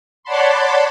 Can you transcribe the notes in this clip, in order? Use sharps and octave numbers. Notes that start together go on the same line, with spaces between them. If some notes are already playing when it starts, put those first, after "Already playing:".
C#5 D5 F#5 A5 B5 C6